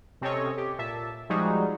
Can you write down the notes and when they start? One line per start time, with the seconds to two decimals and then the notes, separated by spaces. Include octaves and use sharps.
0.22 C3 C4 C#4 A4 C#5 D#5
0.58 G4
0.79 A#2 E5 A5
1.30 F3 G3 G#3 D#4 F#4 G#4